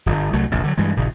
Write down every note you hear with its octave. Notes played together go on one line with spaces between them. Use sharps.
D1 G1
C2 F#3 A3
F1 A#1 E2
D3 E3 F#3
G2 E3 G#3
D#1 A#1 C#3